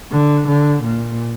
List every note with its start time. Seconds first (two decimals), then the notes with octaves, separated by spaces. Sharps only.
0.12 D3
0.47 D3
0.83 A#2